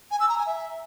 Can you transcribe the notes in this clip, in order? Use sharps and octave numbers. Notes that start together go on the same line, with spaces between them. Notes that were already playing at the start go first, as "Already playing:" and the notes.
G#5
E6
A#5
G#5
E5